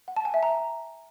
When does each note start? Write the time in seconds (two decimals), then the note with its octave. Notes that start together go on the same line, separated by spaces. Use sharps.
0.08 F#5
0.16 A5
0.25 G#5
0.34 E5
0.43 A#5